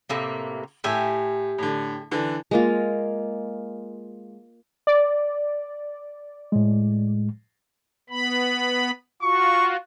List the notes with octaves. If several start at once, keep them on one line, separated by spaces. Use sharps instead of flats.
A2 C3 A#3
A2 G4 E5 G#5
A2 D3
D3 E3
G#3 A#3 F4
D5
A2 G#3
B3 B5
F4 F#4 C#6